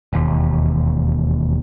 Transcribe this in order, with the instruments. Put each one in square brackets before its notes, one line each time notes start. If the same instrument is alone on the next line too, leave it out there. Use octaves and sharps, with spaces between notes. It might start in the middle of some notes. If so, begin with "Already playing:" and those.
[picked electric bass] E1 D#2